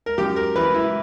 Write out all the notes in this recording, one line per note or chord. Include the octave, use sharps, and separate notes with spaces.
A#4
F#2 G4
A#4
E3 B4
E4